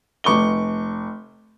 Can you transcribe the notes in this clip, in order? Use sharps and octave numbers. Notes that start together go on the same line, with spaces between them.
F1 C#6 D6 G7